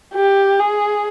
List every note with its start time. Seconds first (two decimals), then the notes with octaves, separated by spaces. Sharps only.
0.14 G4
0.60 G#4